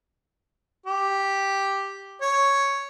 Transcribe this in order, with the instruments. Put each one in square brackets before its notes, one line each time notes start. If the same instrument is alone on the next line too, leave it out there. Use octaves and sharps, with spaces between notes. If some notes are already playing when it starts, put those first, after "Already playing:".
[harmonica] G4
C#5